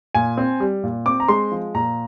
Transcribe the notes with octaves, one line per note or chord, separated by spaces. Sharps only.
A#2 G#5
C4
G3
A#2
C4 D6
A#5
G#3 C6
F3
A#2 A#5